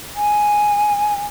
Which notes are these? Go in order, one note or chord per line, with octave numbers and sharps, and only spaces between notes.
G#5